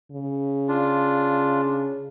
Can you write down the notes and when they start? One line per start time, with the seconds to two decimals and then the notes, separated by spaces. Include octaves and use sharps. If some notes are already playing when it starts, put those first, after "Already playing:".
0.12 C#3
0.68 D4 F4